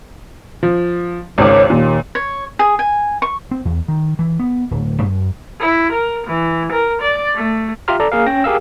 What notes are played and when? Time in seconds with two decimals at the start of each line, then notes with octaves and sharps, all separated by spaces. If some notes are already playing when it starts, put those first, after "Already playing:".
0.63 F3
1.38 G#1 C#2 D#3 C#5 D6
1.70 D#2 A#2
2.15 C#5
2.59 G#4
2.79 G#5
3.22 C#6
3.51 C4
3.65 E2
3.88 D#3
4.19 E3
4.40 B3
4.71 D1
5.02 F#2
5.60 E4
5.93 A#4
6.28 E3
6.72 A#4
7.02 D5
7.36 A3
7.88 F4 G4 E5 A#5 C6 F6
8.00 A4 D5 A#5
8.12 A#3 G#4 A#4 F5
8.26 C#4 C#5 G5 A#6
8.44 G4 G#4 A#4 F5 E6